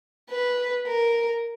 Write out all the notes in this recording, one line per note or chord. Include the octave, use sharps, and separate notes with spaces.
B4
A#4